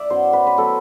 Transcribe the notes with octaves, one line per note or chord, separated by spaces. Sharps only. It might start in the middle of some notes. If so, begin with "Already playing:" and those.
Already playing: D5 E5
F#2 F#3 B3 C5
B4
B4
F#3 B3 A4